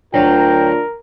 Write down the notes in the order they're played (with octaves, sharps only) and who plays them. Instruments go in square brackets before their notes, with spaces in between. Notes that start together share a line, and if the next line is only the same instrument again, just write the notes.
[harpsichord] D2 F#3 F5 [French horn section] D4 F4 [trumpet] A#4 [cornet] G5